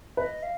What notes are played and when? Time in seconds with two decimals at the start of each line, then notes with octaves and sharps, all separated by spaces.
0.17 B4 D#5
0.43 F5